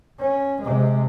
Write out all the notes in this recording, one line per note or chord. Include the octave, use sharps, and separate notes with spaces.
C#4
C3 G#3